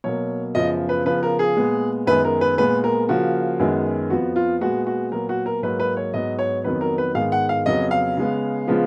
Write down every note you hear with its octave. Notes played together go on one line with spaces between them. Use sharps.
B2 F#3 A#3 C#5
F#2 C#3 F3 B3 D#5
B4
C#3 F3 B3 B4
A#4
G#4
A#2 G#3 B3
F#2 D#3 G#3 B3 B4
A#4
B4
A#2 G#3 B3 B4
A#4
C#3 F3 A#3 F#4
F#2 D#3 G#3 B3
F2 F3 B3 F#4
F4
A#2 G#3 B3 F#4
F#4
A#2 F#3 B3 A#4
F#4
A#4
G#2 F#3 A#3 B4
B4
C#5
G#2 F#3 B3 D#5
C#5
F2 D#3 F#3 B3 B4
A#4
B4
G#2 D#3 G#3 B3 F5
F#5
F5
F2 C#3 F#3 B3 D#5
F5
C#3 G#3 B3
C#3 F3 G#3 B3